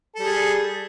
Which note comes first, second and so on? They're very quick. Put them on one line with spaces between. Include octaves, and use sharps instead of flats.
A4 G3 G#4